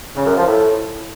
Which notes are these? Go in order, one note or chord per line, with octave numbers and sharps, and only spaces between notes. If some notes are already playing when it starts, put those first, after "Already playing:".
C#3
F#2
F3
A2